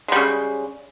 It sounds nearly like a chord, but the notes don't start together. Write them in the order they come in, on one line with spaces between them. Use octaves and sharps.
G#3 G3 C#3